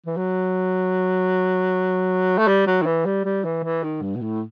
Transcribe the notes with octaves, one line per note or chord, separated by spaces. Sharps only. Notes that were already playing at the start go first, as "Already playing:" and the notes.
E3
F#3
A3
G3
F#3
D#3
E3
G3
G3
E3
E3
D#3
G2
B2
A2